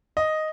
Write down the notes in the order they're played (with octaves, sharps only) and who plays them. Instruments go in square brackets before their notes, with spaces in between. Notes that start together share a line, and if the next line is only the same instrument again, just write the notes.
[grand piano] D#5